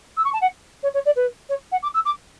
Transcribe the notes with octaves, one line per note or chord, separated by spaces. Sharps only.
E6
C#6
A5
F#5
C#5
C#5
D5
B4
C#5
F#5
D6
E6
D6